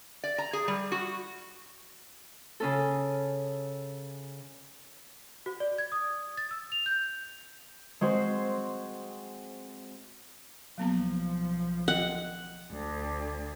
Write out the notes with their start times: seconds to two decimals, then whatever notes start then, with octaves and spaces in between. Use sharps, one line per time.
0.24 D5
0.38 A#5
0.53 G#4
0.68 G3
0.92 F#4
2.60 C#3 C#4 A4
5.46 F#4
5.60 D5
5.78 G#6
5.92 D#6
6.37 A6
6.51 E6
6.72 F7
6.86 G6
8.01 G#3 C4 F#4 C5
10.78 B1 F3 F#3 A#3 B3
11.88 D#5 F#5 G5
12.71 D2